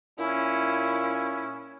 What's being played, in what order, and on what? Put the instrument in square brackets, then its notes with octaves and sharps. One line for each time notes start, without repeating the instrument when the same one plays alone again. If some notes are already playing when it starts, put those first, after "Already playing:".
[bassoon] A#2 [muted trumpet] C#4 [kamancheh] E4